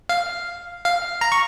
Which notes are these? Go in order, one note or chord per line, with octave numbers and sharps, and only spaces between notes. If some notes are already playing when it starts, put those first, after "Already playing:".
F5
F5
A#5
C#6